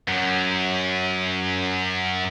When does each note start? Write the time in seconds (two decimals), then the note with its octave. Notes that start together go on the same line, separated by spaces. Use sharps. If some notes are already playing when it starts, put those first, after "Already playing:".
0.08 F#2 F#3